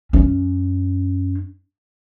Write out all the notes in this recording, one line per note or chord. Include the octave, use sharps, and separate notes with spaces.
F#2 C#4